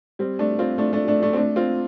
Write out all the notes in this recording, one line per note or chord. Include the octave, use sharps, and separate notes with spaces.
G3 C4
A3 D4
C4 F4
A3 D4
A3 D4
A3 D4
A3 D4
C4
A3 D4
C4 F4